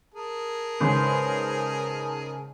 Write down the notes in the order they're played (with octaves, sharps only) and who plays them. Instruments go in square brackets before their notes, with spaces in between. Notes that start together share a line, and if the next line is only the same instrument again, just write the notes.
[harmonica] G#4 A#4 A5
[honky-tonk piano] G#2 C#3 [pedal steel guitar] B4 C5